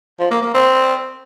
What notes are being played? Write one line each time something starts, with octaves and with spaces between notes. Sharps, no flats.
F3
A#3
A#3
C4